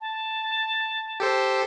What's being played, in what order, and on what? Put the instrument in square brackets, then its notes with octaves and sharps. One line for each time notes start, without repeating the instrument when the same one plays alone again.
[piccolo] A5
[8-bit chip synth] G4 A4 C5